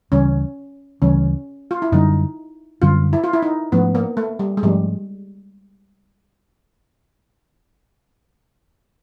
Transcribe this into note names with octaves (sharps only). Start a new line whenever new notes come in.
D2 C#3 E3 G3 C#4
D2 C#3 E3 G3 C#4
F4
E4
F#2 D3 G3 D#4
F#2 D3 G3 F4
E4
F4
E4
D#4
G#2 F3 A3 B3 C#4
A#3
A3
G3
G#3
G#2 F3 G3 A3 C#4